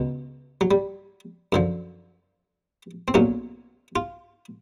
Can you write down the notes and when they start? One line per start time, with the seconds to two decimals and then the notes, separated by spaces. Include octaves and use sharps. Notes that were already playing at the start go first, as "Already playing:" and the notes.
Already playing: C#2 B2
0.61 F#3
0.71 G3
1.52 F#2 D3 F3
3.08 C4
3.14 B1 A#2 F#3 C#4
3.96 F4